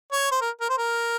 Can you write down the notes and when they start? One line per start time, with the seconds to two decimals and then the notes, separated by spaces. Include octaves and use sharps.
0.12 C#5
0.31 C5
0.41 A#4
0.61 A#4
0.69 C5
0.78 A#4